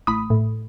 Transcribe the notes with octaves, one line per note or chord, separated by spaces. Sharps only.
A1 B5 D#6
A2